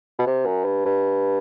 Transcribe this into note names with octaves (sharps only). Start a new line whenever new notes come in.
B2
C3
F#2
G2
G2